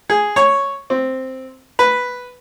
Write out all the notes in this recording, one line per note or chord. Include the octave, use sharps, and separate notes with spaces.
G#4
C#5
C4
B4